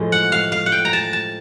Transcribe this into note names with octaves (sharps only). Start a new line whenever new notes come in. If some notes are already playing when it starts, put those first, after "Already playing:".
Already playing: A2 F3 G#3
F#5
F5
F5
F#5
G5
A#5
A5
A5